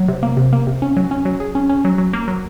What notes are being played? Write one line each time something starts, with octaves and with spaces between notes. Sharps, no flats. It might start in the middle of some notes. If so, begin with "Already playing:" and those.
Already playing: F#3
C3
A#3
C3
A#3
C3
C#4
F#3
C#4
F#3
G#4
C#4
C#4
F#3
F#3
A#3
F#3